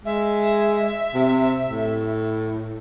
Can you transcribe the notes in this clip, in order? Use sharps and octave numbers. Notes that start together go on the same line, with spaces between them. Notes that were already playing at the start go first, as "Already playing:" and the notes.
G#3 E5
C3
A2